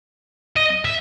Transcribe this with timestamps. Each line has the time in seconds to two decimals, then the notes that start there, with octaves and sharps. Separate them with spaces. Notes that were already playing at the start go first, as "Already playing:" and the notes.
0.56 D#5
0.85 E5